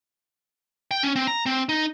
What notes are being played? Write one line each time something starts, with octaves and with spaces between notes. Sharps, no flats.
G5
C#4
C4
A#5
C4
D#4